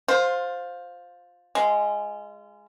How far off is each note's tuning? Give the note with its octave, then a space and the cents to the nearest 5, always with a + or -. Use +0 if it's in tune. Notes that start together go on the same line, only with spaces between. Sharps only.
F4 +15 C5 +0
G#3 +0 F4 -30